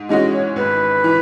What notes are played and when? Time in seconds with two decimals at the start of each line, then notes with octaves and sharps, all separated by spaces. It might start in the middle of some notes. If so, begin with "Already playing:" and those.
Already playing: G#2
0.09 E3 G#3 C#4 F#4 D#5
0.33 C#5
0.56 G#1 B4
1.04 E3